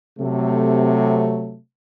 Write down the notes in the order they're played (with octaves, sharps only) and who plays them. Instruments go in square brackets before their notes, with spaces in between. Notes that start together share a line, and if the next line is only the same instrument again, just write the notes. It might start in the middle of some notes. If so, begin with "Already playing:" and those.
[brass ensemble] C3 F#3 A3